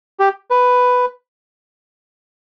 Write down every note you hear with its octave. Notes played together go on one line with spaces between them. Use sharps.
G4
B4